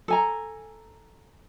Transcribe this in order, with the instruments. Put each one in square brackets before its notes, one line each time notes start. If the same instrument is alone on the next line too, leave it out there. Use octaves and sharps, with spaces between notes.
[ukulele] A4 G#5 A#5